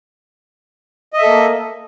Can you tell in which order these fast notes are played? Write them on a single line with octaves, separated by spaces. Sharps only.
D#5 E5 A4 A#3